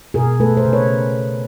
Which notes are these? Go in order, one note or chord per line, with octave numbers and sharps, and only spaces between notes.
B2 G#4 A#4
A3 A4 B4
A#4 C5
C#3
B4 C#5